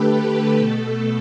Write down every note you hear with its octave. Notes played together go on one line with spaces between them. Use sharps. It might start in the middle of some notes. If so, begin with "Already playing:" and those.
Already playing: D3 A3 G4 A4 B4
A4
B2 A3